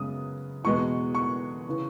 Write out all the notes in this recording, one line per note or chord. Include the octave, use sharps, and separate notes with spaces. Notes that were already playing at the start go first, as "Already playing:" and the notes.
Already playing: F#2 C#3 G#3 B3 D#6
E2 B2 G#3 B3 C#6
C#6
C#3 E3